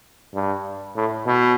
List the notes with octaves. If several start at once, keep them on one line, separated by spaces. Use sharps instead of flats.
G2
A2
B2